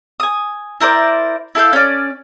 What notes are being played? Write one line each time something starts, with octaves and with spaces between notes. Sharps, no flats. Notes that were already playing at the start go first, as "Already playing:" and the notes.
G#5 D#6
E4 A#4 C5 D5
E4 A4 F5 G6
C#4 D5